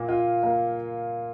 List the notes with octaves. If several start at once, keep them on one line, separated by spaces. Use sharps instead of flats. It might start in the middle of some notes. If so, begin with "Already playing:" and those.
Already playing: A#2 A#3
F4
A#3